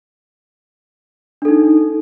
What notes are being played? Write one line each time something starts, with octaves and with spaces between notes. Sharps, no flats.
D4 D#4 A4